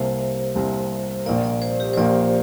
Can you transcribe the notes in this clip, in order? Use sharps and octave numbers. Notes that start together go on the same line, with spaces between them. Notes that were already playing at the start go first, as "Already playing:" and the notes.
Already playing: C2 C3 A#3 C5
C2 C3 A#3
A#1 A#2 A#3 D5
D5
C5
G4
C5
A#1 A#2 A#3 D5